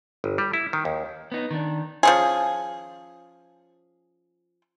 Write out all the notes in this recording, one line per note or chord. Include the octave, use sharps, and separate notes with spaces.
G1
G3
E4
D#3
D#2
B3 D#4
D#3 D4
F3 C#4 G#4